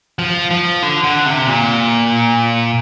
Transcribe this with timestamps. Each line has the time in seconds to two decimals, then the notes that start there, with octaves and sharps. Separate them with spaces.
0.19 F3
0.51 F3
0.83 D3
1.04 D3
1.26 C3
1.46 A#2